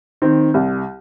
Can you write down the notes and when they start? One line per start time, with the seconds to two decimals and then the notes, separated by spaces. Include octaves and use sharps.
0.22 D#3 C4
0.54 C2